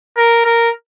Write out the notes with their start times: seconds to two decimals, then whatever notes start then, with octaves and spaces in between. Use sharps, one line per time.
0.17 A#4
0.45 A#4